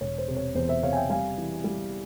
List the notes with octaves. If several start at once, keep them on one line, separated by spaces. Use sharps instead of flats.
E1 C#5
C5
C3
C#5
E2 C5
C5 E5
C3 C#5 F5
G#5
E5 G5
G3 F5 G#5
E3
G3